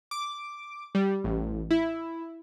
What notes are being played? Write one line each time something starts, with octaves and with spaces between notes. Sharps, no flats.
D6
G3
A1
E4